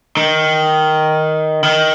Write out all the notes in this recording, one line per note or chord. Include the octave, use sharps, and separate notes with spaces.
D#3
D#3